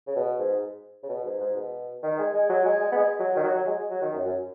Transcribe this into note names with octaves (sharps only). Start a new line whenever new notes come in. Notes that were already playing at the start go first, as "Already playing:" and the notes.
C#3
B2
G#2
C#3
B2
G#2
G#2
B2
D#3
G#3
G#3
F#3
G#3
G#3
B3
G#3
F#3
D#3
F#3
F#3
G#3
F#3
D#3
F#2
F#2